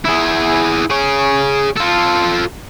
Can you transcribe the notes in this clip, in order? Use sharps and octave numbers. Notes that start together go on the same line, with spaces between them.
E4 G#4
G#4 C#5
F4 A4